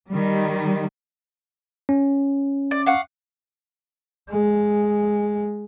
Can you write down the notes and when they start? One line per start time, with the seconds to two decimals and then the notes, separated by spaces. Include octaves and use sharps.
0.11 D#3 G3
1.89 C#4
2.71 D5
2.86 F5 F#5 C#6
4.30 G#3